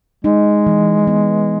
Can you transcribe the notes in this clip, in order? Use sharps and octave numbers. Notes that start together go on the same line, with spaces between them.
G#3 D#4
E3
B3